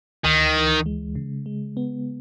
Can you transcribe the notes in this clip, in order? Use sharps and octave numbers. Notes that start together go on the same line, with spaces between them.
D2 D#3
E3
G#3
C#3
G#3
B3